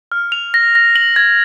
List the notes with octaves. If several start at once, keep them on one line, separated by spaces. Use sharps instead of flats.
F6
F7
A#6
A#6
F#7
G#6